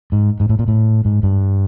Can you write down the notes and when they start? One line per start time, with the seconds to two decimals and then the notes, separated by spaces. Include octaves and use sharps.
0.12 G#2
0.40 G#2
0.49 A2
0.59 A#2
0.68 A2
1.05 G#2
1.23 G2